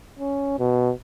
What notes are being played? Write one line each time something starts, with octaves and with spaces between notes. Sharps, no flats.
C#4
B2